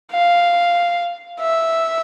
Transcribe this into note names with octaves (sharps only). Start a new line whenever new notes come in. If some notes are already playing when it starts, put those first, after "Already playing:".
F5
E5